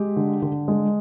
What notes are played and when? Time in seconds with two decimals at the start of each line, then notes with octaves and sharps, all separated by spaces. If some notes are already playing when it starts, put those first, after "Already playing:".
Already playing: G#3 G4
0.16 D3
0.42 D3
0.68 G#3